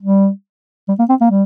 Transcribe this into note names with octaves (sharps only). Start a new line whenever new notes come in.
G3
G3
A#3
C4
A#3
G3